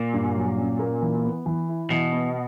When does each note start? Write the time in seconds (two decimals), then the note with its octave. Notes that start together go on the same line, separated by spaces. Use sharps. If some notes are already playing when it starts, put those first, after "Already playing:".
Already playing: A#2 A#3
0.13 G2
0.35 F#3
0.57 C#4
0.79 A#3
1.02 E3
1.24 B3
1.46 E3
1.69 E4
1.90 B2 E3
2.12 B3